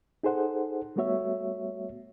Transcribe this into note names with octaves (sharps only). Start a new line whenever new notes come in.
D#4 G#4 A4 C5 F#5
G3 A3 B3 F#4 C#5 E5